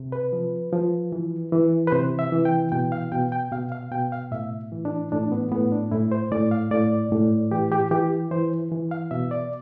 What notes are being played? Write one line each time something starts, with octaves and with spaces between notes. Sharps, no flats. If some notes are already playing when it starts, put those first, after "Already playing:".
Already playing: C3
B4
F3
F3
E3
E3
B4
C3 C5
E5
E3
G5
B2 G5
F5
B2 G5
G5
B2 F5
F5
B2 G5
F5
A2 E5
E3
D4
A2 D4
B3
A2 B3
D4
A2 E4
C5
A2 D5
F5
A2 D5
A2
E3 G4
G4
E3 G4
E3 C5
E3
F5
B2 E5
D5